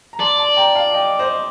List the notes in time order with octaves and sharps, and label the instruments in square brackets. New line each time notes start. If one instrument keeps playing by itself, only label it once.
[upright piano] A#5
[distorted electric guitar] D5 [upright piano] A5 C6
[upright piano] A5 C6
G5 A#5
F5 A5
D#5 G5
C5 D#5